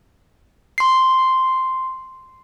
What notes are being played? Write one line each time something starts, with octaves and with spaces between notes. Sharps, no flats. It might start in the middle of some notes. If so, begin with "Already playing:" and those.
C6 C7